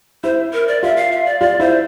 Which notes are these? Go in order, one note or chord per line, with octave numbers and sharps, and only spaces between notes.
E4 C5
A#4
D5
F4 E5
F5
E5
D5
F4 D5
E4 C5